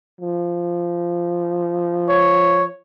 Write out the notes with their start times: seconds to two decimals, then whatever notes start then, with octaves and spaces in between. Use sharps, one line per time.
0.21 F3
2.09 C#5